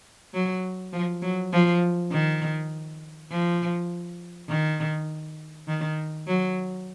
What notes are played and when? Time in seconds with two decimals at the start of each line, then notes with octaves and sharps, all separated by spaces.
0.34 F#3
0.93 F3
1.22 F#3
1.53 F3
2.12 D#3
3.31 F3
4.49 D#3
5.68 D#3
6.27 F#3